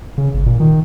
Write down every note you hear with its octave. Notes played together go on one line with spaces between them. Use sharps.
C#3
G1
A#2
D#3